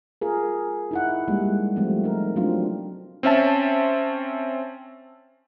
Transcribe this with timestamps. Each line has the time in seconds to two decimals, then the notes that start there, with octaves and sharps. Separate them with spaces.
0.21 F4 G#4 A#4
0.91 D#4 E4 F#5
1.28 G3 G#3 A#3
1.76 F3 G3 A3 C4
2.04 D#4 A#4
2.36 F#3 A3 C4 D4 F4
3.23 C4 C#4 E5 A5